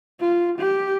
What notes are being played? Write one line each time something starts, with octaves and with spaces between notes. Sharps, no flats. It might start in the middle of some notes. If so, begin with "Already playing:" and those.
F4
G4